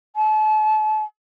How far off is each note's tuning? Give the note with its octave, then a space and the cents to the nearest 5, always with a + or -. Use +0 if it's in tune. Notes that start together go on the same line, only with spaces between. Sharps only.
A5 -40